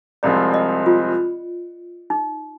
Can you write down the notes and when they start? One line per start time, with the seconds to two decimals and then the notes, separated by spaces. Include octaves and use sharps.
0.23 C2 C3 F3 G#3 C4 D5
0.54 D#5
0.86 F4
2.10 D#4